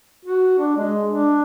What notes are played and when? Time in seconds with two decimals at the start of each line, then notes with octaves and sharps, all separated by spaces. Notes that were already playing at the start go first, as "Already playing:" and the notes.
0.25 F#4
0.58 D4
0.77 G#3
1.10 D4